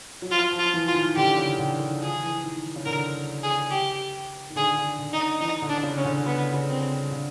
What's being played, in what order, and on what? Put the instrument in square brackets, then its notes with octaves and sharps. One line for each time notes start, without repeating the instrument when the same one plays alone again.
[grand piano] F#3
[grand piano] F3 [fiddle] F4
[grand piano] F3
[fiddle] F4
[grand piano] E3
[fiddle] F4
[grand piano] D#3
[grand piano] D3 [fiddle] G4
[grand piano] C#3
D3
D#3
[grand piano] F3 [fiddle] G#4
[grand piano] E3
D#3
C#3
[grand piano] D3 [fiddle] A#4
[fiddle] G#4
G4
[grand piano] D#3
[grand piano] D3 [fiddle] G#4
[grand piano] D3
D3
[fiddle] D#4
[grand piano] E3 [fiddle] D#4
[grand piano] D3
[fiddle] D4
[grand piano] C#3
[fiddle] C#4
[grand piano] D3
[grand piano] C#3 [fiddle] B3
[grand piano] C#3
[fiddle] C4
[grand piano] D3